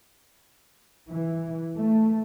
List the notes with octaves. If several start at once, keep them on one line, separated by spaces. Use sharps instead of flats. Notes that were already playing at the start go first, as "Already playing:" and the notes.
E3
A3